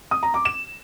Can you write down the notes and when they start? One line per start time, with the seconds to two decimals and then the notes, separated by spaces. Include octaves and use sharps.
0.11 D#6
0.23 A#5
0.34 D6
0.45 E7